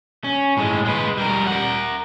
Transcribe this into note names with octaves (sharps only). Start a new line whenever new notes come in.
C#4
A2 G#3
G#3 B4
G3 A#4
A#4 F#5